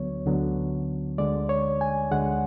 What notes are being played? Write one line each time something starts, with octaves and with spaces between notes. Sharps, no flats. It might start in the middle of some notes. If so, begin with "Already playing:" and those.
Already playing: D2 D3 F#3 B3 C#5
D2 D3 F#3 B3
D2 D3 G#3 D5
C#5
G#5
D2 D3 G#3 F#5